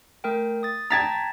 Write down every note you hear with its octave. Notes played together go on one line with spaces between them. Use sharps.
A3 A#4 G5
D#6 A6
G5 A5 A#5 G#6 A6 B6